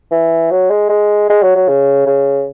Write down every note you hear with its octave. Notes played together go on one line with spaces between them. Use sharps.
E3
F#3
G#3
G#3
G#3
F#3
F#3
C#3
C#3